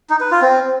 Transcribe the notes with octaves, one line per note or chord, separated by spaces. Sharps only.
D#4
B4
F4
C4